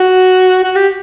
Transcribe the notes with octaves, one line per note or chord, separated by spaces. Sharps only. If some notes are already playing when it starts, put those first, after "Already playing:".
Already playing: F#4
F#4
G4